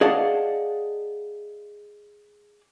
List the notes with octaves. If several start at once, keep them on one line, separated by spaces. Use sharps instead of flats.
G#4 D5 D#5 F5 F#5 A5